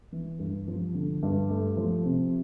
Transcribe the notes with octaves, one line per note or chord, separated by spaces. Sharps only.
E3
G2
F3
D3
G2
A3
F3
C3